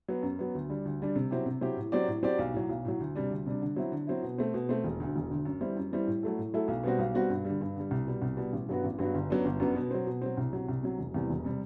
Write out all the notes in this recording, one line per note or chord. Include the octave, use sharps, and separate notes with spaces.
F#3 B3
F#2
F#3 B3
D2
D3 G3 D4
D2
D3 G3 D4
C3
F#3 C4 E4 G4
C3
F#3 C4 E4 G4
A2
F#3 C4 G4 D5
A2
F#3 C4 G4 D5
B1
A2 F#3
B1
A2 F#3
D2
C3 G3 D4
D2
C3 G3 D4
D3
F#3 C4 E4
D3
F#3 C4 E4
B2
A3 C4
B2
A3 C4
E1
D2 D3
E1
D2 D3
F#2
E3 G3 C4 E4
F#2
E3 G3 C4 E4
A2
F#3 A3 E4 A4
A2
F#3 A3 E4 A4
B1
B2 G3 C4 F#4
B1
B2 G3 C4 F#4
G2
D3 G3
G2
D3 G3
C2
B2 G3
C2
B2 G3
A1
G2 F#3 B3 F#4
A1
G2 F#3 B3 F#4
G1
F#2 F#3 B3 D4
G1
F#2 F#3 B3 D4
B2
F#3 C4
B2
F#3 C4
C2
C3 F#3
C2
C3 F#3
E1
E2 C3 G3
E1
C3 G3